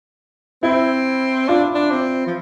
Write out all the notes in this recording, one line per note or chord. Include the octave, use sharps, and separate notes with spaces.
C4 E4
D4 F4
D4
C4
F3